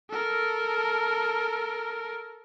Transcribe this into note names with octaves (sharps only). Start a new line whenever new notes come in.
A4 A#4